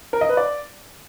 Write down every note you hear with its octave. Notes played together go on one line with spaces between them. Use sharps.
A#4
D#5
B4
D5